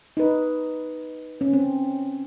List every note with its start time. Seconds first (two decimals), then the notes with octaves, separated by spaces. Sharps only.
0.17 D#4 B4
1.41 C#4
1.53 C4